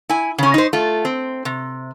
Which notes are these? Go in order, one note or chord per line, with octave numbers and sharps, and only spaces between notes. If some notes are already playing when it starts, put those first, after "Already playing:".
E4 G#5
C#3 C#4
D#4 C5
A3 F4
C4
C3